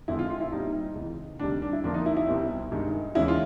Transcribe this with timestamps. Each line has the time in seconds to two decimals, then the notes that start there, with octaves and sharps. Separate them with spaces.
0.08 F2 D3 F3 G#3 C4 E4
0.19 F4
0.30 F4
0.41 E4
0.52 A#2 G3 C4 D#4
0.95 C#2 C3 E3
1.39 D2 C3 D#3 G3 D4
1.62 D4
1.73 E4
1.83 F2 D3 F3 A#3 D4
1.94 D#4
2.06 E4
2.17 E4
2.27 C2 B2 G3 C4
2.72 G2 D#3 G#3
3.15 D#2 C#3 E3 G#3 C#4 E4
3.28 F4